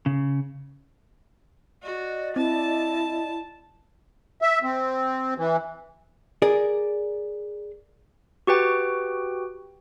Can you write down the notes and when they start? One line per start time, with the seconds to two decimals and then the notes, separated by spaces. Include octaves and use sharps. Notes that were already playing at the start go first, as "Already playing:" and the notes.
0.06 C#3
1.83 F#4 D5 D#5
2.36 C4 E4 A5
4.42 E5
4.63 C4
5.38 E3
6.42 G#4 A#4 D5
8.47 F#4 G4 B4 G5